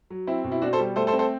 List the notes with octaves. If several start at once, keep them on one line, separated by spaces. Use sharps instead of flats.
F#3
C4 E4
B2
E4
B2 D4 F#4
A4 C5
G3
A3 A4 C5
A4 C5
C4
A4 C5